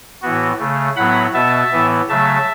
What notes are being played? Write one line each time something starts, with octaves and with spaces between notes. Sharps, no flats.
A2 E3 B3 F#4
C#3 A3
A2 F#3 B3 F#5 B5
B2 B3 E5 A5
A2 E3 B3
C#3 F#3 A3 E5 A5